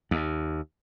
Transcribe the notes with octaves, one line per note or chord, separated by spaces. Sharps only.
D#2